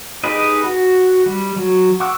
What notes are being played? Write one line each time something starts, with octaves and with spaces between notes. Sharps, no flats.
D#4 G4 G#4 B4 D#5
F#4
G3
F#3
F#5 C#6 D6 E6 F#6